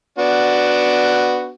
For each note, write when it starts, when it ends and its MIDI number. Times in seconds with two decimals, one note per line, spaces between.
0.19 1.51 59
0.19 1.51 62
0.19 1.51 66